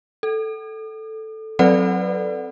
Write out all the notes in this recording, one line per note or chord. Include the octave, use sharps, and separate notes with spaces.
A4
F#3 C4 A4 B4 D5 F#5